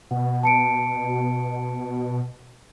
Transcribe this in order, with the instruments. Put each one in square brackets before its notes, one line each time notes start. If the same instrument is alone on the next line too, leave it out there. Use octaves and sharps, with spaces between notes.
[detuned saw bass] B2 [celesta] F#5
[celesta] A5 C#7 D7